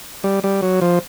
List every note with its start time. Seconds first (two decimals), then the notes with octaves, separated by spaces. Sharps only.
0.24 G3
0.44 G3
0.62 F#3
0.81 F3